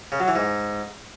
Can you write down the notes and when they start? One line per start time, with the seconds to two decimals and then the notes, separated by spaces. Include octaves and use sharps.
0.12 C#3
0.20 F#3
0.28 E3
0.36 G#2